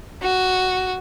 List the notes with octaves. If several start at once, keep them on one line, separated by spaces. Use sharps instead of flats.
F#4